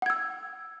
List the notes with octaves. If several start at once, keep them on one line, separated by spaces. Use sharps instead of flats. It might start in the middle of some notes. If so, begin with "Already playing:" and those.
F#5 E6 G#6